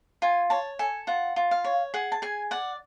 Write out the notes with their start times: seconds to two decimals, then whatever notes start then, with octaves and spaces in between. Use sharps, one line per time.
0.22 F4 G#5
0.50 C#5 A5
0.79 A4 G#5
1.07 F4 F#5
1.36 F4
1.51 F5
1.65 C#5
1.94 G#4 F#5
2.12 A5
2.22 G#4 G#5
2.51 D5 F#5